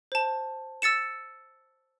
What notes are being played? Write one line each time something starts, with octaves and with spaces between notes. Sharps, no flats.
C5 A5
E6 A6 C#7 E7